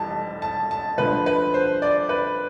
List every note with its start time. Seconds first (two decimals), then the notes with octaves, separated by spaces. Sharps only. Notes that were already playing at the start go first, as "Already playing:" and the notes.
Already playing: F1 F2 E3 G3 A5
0.42 A5
0.71 A5
0.98 D2 D3 F3 B4
1.26 B4
1.54 C5
1.82 D5
2.09 B4